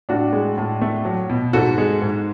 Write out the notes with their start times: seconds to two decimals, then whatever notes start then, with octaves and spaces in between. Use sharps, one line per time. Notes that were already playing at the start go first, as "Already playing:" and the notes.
0.09 A2 D4 F#4
0.33 G#3
0.58 A2
0.81 A3
1.05 F#3
1.29 B2
1.53 G#2 F#4 A4
1.78 G#3
2.02 G#2